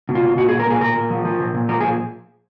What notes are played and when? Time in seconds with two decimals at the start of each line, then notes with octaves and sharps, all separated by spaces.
0.09 B2
0.15 F4
0.23 B2
0.37 A#2 F#4
0.49 G#4
0.52 A#2
0.60 A#4
0.67 A#2 G#4
0.81 A#2 A#4
0.96 A#2
1.10 F3
1.25 F3
1.40 A#2
1.54 A#2
1.69 F3 A#4
1.81 G#4
1.84 A#2